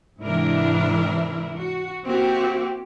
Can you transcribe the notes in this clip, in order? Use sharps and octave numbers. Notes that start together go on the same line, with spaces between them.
G#2 C3 E3 D4 E4 A#4
F#4
A#3 C4 E4 F#4 G4